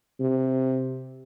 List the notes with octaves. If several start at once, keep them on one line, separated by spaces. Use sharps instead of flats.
C3